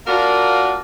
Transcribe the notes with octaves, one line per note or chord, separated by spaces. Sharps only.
A#3 D4 F4 F#4 A#4